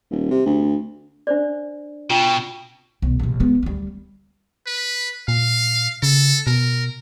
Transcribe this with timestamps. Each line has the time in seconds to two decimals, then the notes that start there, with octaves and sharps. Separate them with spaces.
0.11 D#1
0.30 C3
0.46 D2
1.27 D4 C5 D5
2.10 B2 F4 G5
3.02 B1
3.20 A#1 C3
3.40 G#3 B3
3.63 D2 G3
4.67 B4
5.28 A#2 F5
6.03 C#3 A4
6.47 B2 A#4